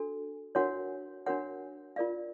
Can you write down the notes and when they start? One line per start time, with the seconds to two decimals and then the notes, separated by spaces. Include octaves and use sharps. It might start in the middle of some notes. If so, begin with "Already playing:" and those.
Already playing: D4 F#4 A4
0.55 D4 F#4 A#4 C#5 F#5
1.26 D4 F#4 A#4 C#5 F#5
1.96 F4 A#4 D5 F5